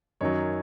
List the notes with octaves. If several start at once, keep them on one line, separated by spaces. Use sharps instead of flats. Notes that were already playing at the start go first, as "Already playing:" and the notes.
F#2 D#3 F#3 C#5 D#5